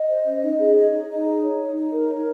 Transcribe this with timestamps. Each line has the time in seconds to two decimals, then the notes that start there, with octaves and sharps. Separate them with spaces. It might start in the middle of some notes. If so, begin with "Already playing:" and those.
Already playing: D#5
0.08 C5
0.25 C#4
0.42 D#4
0.58 G#4
0.75 C#5
0.92 D#4
1.09 D#4
1.25 G#4
1.42 C#5
1.59 D#4
1.75 D#4
1.92 A#4
2.09 C#5